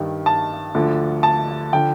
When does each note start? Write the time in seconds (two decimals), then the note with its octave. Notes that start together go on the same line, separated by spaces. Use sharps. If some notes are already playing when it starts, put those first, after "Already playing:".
Already playing: G2 D#3
0.26 A5
0.75 D2 D3 F3
1.23 A5
1.73 D3 F3 G5